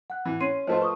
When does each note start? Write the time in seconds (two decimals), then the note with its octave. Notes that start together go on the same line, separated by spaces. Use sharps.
0.10 F#5 F#6
0.25 E3
0.41 C#4 C6 C7 D#7
0.67 F3 A3 F4 C5 D#5
0.80 B4 C#6 D#6